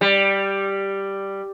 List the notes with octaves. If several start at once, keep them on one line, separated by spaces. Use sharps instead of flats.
G3